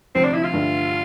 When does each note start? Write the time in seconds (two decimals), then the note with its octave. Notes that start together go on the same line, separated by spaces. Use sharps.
0.15 D2 C3 F3 C4
0.24 D4
0.34 E4
0.43 F4
0.52 G2 D3 A3